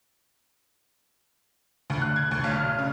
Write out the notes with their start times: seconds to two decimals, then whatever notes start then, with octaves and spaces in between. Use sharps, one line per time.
1.90 D2
2.02 F#6
2.16 G#6
2.31 D2
2.44 B1
2.56 F6
2.79 C#3